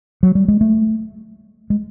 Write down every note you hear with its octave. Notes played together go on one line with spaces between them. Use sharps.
F#3
G3
G#3
A3
G#3